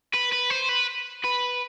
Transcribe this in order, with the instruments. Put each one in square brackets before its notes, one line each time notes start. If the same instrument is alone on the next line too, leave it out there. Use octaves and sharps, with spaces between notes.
[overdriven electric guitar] B4
B4
C5
B4
B4